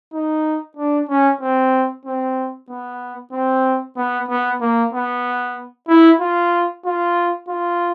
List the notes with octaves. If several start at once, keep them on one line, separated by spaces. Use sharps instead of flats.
D#4
D4
C#4
C4
C4
B3
C4
B3
B3
A#3
B3
E4
F4
F4
F4